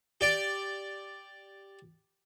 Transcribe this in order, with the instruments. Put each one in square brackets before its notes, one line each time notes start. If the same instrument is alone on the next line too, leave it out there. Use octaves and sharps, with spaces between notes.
[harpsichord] G4 D5